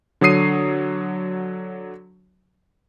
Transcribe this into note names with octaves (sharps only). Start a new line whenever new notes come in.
D3 F#3 C#5 D#6 C7 D#7